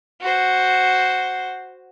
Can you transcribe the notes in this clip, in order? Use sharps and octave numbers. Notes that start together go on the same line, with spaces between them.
F#4 C5